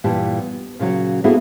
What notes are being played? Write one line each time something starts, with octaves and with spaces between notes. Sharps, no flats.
G2 A#2 E3 G4 A5
B3
A#2 C#3 F#3 F#4
A#3 B3 E4 F#4 G#4 A4